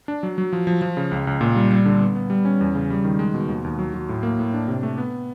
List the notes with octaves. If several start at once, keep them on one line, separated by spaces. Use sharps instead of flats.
D4
F#3
F#3
F3
F3
F3
C#3
C#2
C#2
A#2
G3
G3
D3
B3
B3
G3
C#4
E2
C#3
G3
D#3
G#3
B2
D#2
D#2
F#3
F#3
A2
A#3
A2
D4
C3
A3
B3